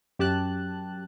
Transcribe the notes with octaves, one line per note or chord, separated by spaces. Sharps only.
F#2 G4 A5 F#6